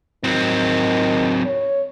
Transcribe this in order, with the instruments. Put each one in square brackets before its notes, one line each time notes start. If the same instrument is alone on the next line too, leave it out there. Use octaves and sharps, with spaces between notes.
[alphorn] D#3 [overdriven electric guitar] F#3 C4
[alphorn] C#5